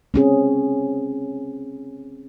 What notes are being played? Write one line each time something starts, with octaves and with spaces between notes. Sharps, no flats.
C4 C#4 G#4